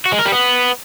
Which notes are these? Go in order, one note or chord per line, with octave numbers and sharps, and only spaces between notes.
F#4
G#3
A#4
G3
B3